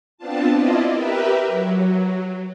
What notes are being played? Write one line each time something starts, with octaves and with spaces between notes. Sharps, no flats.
B3 C4 D4 F4 A5
E4 F4 D5 D#5
G4 A#4 B4 E5
F#3